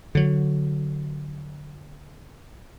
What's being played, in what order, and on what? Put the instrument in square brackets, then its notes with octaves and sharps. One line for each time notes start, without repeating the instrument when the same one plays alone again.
[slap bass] D3 F#3